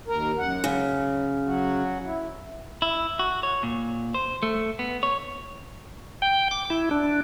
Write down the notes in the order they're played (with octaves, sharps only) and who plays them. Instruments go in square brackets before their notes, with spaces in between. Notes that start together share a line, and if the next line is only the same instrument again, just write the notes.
[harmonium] D#2 A#4
F#2 F#5
[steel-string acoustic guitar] C#3 [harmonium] F#3
[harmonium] F#3 F#4
E4
[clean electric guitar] E4
F#4
C#5
A#2
C5
A3
B3
C#5
[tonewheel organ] G5
D6
E4
D4